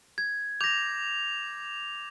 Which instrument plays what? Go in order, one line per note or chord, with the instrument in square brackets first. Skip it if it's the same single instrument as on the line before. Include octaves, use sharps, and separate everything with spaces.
[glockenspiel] G#6
[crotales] D6 F7 [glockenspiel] G6 A#6